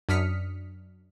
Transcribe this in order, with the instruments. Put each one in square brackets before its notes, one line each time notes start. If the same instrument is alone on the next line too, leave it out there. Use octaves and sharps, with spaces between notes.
[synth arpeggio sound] F#2 D4 D#6 F6 B6 C#7